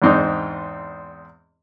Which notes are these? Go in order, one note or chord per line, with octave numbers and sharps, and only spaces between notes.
E2 G#2 C4 D4 D#4